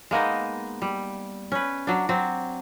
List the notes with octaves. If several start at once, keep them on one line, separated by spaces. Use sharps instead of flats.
G#3 A#3 B3 D#4
G3
C#4 B4
F#3 D4
F#3 C4